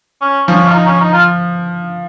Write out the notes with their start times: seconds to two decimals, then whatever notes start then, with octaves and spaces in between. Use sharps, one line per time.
0.21 C#4
0.47 F3 C#4
0.68 F4
0.74 D#4
0.87 C#4
1.00 D#4
1.13 F4